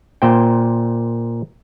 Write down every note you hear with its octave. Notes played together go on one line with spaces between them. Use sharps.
A#2 C5 G5